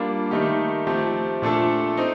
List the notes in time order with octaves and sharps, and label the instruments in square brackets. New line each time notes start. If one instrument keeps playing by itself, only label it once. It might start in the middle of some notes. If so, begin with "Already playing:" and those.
Already playing: [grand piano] G3 A#3 D4 F4
D#3 A3 D#4 G4
F3 A3 C4 G4
A#2 A3 D4 A4
C4 D#4